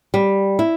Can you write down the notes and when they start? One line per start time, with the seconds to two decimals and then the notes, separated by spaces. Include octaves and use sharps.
0.14 G3
0.59 E4